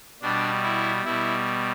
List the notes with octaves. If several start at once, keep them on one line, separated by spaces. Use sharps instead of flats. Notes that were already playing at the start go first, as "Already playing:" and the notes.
B2 G3 D4
E4
B2 G3 E4